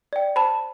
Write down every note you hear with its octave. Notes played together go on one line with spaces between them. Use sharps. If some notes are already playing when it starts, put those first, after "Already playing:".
D5 G5
C5 A5 B5